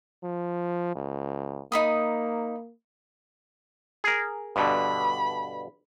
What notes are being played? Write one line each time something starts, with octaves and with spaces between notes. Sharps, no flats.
F3
C#2
A#3 D#4 B5 D#6
G#4 A#4
G2 B2 D3 B5